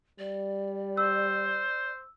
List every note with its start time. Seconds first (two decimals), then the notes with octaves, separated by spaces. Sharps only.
0.19 G3 D5
0.97 C5 E6